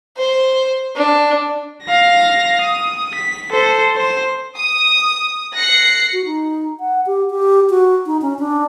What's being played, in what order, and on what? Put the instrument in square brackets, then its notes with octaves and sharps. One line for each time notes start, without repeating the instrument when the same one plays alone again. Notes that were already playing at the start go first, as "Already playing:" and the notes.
[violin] C5
D4
[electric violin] F5 A#6
D#6
B6
A4 C5
C5
[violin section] D#6
F#6 A#6 C7 C#7
[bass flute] F#4
D#4
F#5
G4
G4
F#4
D#4
C#4
D4